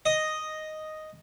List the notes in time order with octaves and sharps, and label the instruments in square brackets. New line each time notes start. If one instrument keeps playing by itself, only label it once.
[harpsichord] D#5